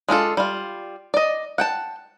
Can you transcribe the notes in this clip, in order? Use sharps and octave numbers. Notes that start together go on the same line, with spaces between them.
G#3 D4 F4 A4
G3 F4
D5 D#5
F#5 G5 A5